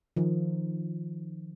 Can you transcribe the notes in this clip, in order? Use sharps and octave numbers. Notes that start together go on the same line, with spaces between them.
D#3 F3